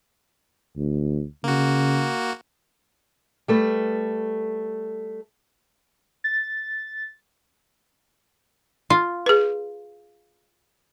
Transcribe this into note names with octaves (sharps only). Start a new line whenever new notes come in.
D2
C#3 A#3 F#4
G3 A3 B4
A6
F4
G#4 B4